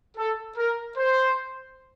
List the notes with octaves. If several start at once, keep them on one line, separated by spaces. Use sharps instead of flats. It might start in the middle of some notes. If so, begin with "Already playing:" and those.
A4
A#4
C5